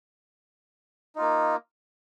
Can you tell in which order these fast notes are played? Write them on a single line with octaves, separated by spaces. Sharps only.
D#4 F4 A#3